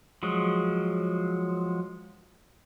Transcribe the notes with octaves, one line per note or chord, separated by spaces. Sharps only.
F3 F#3 G#3